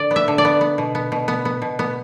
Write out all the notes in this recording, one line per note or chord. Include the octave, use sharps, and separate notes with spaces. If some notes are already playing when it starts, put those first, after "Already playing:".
Already playing: D3 D5
B3
E5
D3
D5
B3
B3
B2
B3
B2
B3
B3
B2
B3